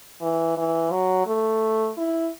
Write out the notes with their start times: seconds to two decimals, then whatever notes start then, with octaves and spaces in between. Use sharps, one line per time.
0.21 E3
0.57 E3
0.91 F#3
1.27 A3
1.98 E4